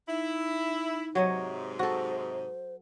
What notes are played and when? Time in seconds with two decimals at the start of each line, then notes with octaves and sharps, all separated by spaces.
0.08 D#4 E4
1.15 G#2 C3 F#3 C#5 D#5
1.79 F#4 A4 C5